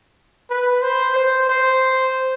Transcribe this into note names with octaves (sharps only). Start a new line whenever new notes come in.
B4
C5
C5
C5